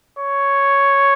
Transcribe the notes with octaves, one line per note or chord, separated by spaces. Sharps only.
C#5